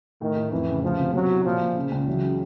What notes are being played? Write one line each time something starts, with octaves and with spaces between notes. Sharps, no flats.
A2 D#3
A2
F2 E3
C#3
D2 F3
C3
F#3 B3
E4
A#2 F3
A#2
C#3
C#2
E3 F#3
C#3